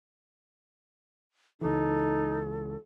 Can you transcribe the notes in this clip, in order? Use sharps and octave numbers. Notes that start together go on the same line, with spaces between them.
C#2 E3 D#4 A4